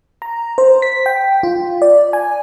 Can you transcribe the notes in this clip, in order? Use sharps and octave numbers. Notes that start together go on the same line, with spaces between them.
A#5
C5
B6
G5
F4
D5
G#5